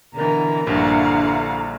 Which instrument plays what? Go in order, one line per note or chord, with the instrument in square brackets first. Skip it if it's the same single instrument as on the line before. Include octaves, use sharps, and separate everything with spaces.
[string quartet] B2 D3 E3 [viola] A#4 [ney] A#5
[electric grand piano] A#1 G2 [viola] D3 D4 [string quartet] E4 F5 F#5